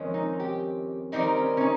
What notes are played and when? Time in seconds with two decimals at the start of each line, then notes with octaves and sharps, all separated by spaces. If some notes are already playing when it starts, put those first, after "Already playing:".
Already playing: F2 D#3 G#3 C#4
0.14 D#4
0.40 G4
1.12 D#3 G3 C4 D#4 G4 A#4
1.37 C#4
1.57 C#4
1.61 D#4